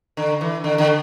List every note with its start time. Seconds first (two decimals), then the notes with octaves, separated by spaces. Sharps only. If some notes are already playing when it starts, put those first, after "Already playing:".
0.17 D3
0.41 E3
0.64 D3
0.78 D3